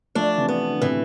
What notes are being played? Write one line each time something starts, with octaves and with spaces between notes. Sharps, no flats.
F3 A3 D4
C3 E3
B3
D3
A2 C3 E3